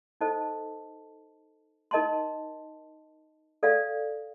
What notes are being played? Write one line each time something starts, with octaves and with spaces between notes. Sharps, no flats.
D#4 A4 C5 D#5 A5
D#4 A#4 D#5 A5 C6
A4 D5 F5